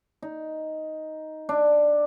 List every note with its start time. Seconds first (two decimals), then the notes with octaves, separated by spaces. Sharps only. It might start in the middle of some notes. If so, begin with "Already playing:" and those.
0.22 D#4
1.49 D4